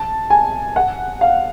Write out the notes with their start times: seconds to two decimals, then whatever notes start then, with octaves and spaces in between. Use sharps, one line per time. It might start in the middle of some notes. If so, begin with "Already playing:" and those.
Already playing: A5
0.30 G#5
0.76 F#5
1.21 F5